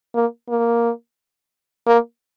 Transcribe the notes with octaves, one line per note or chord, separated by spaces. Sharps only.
A#3
A#3
A#3